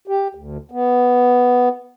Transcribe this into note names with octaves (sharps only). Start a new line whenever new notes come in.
G4
D2
B3